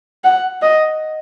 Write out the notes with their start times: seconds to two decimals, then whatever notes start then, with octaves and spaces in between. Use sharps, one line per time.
0.24 F#5
0.62 D#5